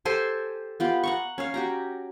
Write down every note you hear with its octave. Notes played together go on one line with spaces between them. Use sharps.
G4 A4 C5 G#5
B3 F4 G4
F#5 A#5 C#6
C#4 C#5 F5
F#4 G4 A#5